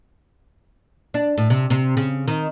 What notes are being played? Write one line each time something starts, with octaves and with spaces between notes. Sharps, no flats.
D4
A2
C3
C3
C#3
D#3